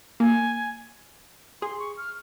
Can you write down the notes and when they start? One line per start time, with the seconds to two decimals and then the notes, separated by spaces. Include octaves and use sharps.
0.20 A#3 G#5
1.62 G#4 C6
1.79 C#6
1.97 F6